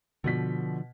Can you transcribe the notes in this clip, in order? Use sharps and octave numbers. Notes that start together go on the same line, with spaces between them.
B2 D3 F3 B6